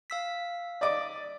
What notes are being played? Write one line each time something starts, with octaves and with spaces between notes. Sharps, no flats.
F5 E6 B6
D5 D#5 D6